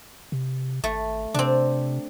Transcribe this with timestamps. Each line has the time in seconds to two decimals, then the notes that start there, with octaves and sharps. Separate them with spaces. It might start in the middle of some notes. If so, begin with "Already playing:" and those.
0.32 C3
0.84 G#1 A3
1.34 C3 C4 D4